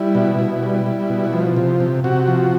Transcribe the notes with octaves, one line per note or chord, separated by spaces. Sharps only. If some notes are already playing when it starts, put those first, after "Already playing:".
Already playing: G3 E4
B2
B2
G3
G3
B2
F3
C3
C3
C3 F#4
F3